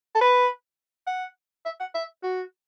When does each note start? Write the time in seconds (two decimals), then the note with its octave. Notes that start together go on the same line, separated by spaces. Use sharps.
0.15 A4
0.21 B4
1.07 F#5
1.66 E5
1.80 F#5
1.95 E5
2.24 F#4